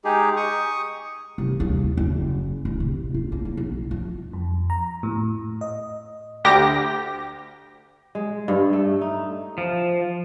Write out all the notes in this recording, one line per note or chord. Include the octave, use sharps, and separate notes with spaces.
G#3 D#4 G4 G#4
C#6 D#6
C2
D#2
F#1
D1
C3
F4
A#3
A#3
B1
F3
F2
A#5
A2
D#5
D2 G4 A#6
G#3
G2
A3
D#4
F3